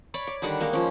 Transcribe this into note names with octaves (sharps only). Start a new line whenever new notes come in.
C#5 D5 B5
D6
D3 D#3 G3 F#5
G#3 A#3 D#4
F3 C#4